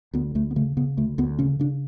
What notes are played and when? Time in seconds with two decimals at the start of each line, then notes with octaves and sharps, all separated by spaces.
0.14 D2 B3
0.35 D2 A3
0.51 B3
0.56 C#3 A3
0.77 C#3 B3
0.97 D2 A3
1.18 D2 B3
1.39 C#3 C#4
1.59 C#3 D4